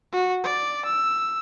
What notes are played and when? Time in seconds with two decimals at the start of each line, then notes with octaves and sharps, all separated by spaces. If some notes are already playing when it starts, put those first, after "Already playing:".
0.13 F#4
0.44 D5
0.85 E6